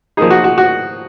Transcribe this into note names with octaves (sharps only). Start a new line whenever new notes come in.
F3 A#3 D#4 G#4
F#4
F#4
F#4